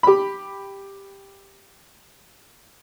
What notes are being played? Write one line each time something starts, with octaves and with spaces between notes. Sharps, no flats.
G4 B5